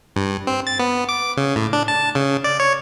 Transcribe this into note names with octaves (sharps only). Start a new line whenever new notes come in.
G2
C4
A6
B3
D6
C#3
A2
D4
A5
C#3
D5
C#5